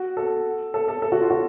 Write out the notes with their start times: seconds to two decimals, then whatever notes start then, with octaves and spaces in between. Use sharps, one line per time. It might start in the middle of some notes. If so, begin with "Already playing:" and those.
Already playing: F#4
0.17 A4
0.74 A4
0.88 A4
1.02 A4
1.12 F#4
1.21 F4
1.31 F#4